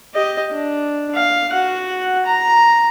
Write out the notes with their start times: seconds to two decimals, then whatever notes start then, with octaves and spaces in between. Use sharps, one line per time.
0.14 G4 D#5
0.52 D4
1.15 F5
1.50 F#4 F#5
2.26 A#5